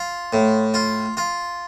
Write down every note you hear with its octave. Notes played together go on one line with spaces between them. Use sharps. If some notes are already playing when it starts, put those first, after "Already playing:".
Already playing: F4
A2
F4
F4